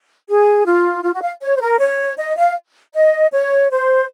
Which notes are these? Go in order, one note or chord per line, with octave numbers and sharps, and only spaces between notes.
G#4
F4
F4
F#4
F5
C#5
C5
A#4
C#5
D#5
F5
D#5
C#5
C5